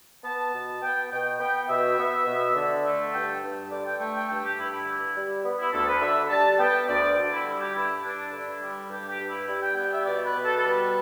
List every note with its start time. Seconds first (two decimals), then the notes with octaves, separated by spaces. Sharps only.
0.24 B3 A5
0.53 B2
0.82 B3 G5
1.11 B2 G5
1.40 B3 G5
1.69 B2 E5
1.98 B3
2.26 B2
2.55 D3
2.84 A3
3.13 G2 G5
3.42 G2
3.71 D3 D5
3.85 G5
3.99 A3 G5
4.14 G5
4.28 G2 G5
4.43 G4
4.58 G2 E4
4.72 E4
4.86 D3
5.15 G3
5.44 B3
5.58 E4
5.73 D2 A4
5.87 B4
6.01 D3 E5
6.30 G3 A5
6.59 B3 G5
6.88 D2 D5
7.17 D3
7.32 E4
7.45 G3 E4
7.61 G4
7.75 G2 E4
8.04 G2 D4
8.32 D3 E4
8.61 G3
8.90 G2 G4
9.09 G4
9.19 G2
9.29 E4
9.48 G3 E4
9.62 G5
9.76 B3 G5
9.92 E5
10.06 B2 D5
10.25 B4
10.34 B2
10.44 A4
10.56 A4
10.63 G3 B4